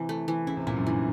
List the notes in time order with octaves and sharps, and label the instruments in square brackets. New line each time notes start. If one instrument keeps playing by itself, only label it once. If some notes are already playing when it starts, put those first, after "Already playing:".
Already playing: [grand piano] C3 [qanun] E3
[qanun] A3
E3
[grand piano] C#3 [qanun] E4
[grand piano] C3
[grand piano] A#2 [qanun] E4
[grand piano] F#2
[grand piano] G2 [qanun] E3